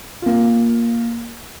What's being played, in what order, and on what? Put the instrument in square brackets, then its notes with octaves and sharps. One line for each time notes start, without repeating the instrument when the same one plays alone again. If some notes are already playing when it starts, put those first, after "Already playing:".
[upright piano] A#3 F4